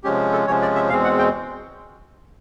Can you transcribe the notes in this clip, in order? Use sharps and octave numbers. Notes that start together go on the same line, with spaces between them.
C3 F3 G#3 C#4 G4
A4
C3 F3 G#3 C#4 C#5
D5
E5
E2 B2 G#3 C4 F5
F#5
G5